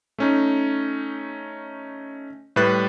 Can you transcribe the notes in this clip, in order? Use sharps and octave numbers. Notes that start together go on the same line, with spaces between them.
A3 C#4 D#4
A2 G3 B4 F#6 A6